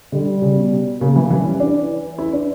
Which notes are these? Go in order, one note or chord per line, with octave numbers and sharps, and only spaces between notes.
D3 G3
C#3
B2
C#3 A#3
E3
E3 G3
C#4
E3 D4
E3
E4
D4